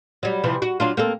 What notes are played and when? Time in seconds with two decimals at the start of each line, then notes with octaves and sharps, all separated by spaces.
0.23 F#3 G3
0.44 C3 E3 F3
0.62 F#4
0.80 F#3 D4 F4
0.97 A#3 C4 A4